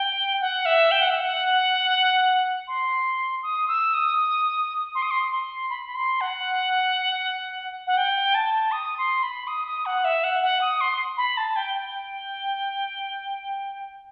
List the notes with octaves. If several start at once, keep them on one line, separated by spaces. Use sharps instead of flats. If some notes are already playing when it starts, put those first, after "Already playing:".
Already playing: G5
F#5
E5
G5
F#5
E5
F#5
C6
D#6
E6
D#6
C6
D#6
C6
C6
B5
B5
C6
F#5
F#5
G5
A5
D#6
C6
B5
D#6
D#6
F#5
E5
F#5
F#5
D#6
C6
B5
A5
G5
G5